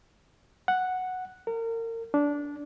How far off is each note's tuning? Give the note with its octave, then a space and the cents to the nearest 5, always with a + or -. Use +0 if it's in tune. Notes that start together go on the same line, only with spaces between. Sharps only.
F#5 +0
A#4 -30
D4 -15